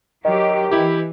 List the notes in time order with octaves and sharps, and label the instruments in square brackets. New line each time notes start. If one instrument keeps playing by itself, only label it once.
[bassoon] D#3 [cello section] F#3 G4 [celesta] D#5
[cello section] E3 [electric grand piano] E4 G4